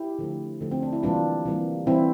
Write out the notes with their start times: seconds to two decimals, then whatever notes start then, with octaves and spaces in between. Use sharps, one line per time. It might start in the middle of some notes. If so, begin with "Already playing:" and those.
Already playing: E4 G4
0.19 D3 F3 A3
0.61 D3 F3 A3
0.72 C4
0.83 D4
0.93 E4
1.03 C3 E3 G3 A#3 D4 F4
1.45 C3 E3 G3 A#3
1.87 C3 E3 G3 C4 E4